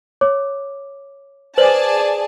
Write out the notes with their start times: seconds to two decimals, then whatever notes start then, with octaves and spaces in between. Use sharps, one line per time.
0.21 C#5 D6
1.58 G#4 B4 C5 D5 A5 F#7